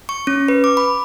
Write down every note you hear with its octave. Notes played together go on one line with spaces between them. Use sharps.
C#6
C#4
B4
D6
B5